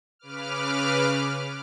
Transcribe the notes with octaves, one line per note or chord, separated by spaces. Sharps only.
C#3 B4 D6 F6